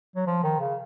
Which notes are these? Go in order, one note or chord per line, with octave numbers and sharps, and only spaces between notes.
F#3
F3
D#3
C#3